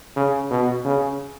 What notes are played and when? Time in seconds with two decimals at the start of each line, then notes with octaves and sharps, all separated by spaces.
0.16 C#3
0.50 B2
0.85 C#3